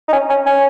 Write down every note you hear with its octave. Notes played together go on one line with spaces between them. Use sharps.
D#4
C#4
C#4
C#4